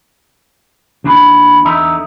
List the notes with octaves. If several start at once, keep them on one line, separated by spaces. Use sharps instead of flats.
D#2 D4 E4 G#5 B5
E2 D3 D#4 E5 A#5